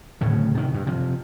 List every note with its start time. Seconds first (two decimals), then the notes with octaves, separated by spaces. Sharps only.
0.21 D1 A2 C#3
0.55 C3 D#3
0.74 G2
0.87 C3 F3